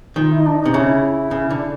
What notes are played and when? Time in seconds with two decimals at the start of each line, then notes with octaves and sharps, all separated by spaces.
0.16 D#3 F4
0.31 E4
0.39 D#4
0.46 D4
0.59 D#4
0.65 C3
0.73 C#3 E4
1.31 C#3
1.50 D3